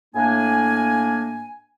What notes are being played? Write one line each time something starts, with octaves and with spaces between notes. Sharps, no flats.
A2 A#3 D4 G#5